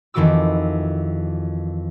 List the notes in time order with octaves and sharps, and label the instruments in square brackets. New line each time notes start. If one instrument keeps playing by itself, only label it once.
[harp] F2 D#3 E3 F#4 D6 E6